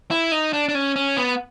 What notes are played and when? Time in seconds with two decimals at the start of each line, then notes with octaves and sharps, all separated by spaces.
0.11 E4
0.32 D#4
0.53 D4
0.69 D4
0.75 C#4
0.96 C#4
1.17 B3